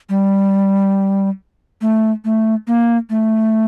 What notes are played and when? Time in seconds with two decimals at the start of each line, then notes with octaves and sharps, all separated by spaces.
0.09 G3
1.81 A3
2.25 A3
2.67 A#3
3.10 A3